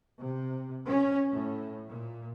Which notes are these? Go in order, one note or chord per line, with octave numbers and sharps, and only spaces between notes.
C3
C#4
A2
A#2